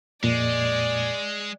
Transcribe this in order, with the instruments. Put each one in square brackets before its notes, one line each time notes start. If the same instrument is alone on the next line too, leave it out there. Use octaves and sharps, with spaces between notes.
[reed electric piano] F2 A#2 [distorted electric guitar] G#3 [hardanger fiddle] D5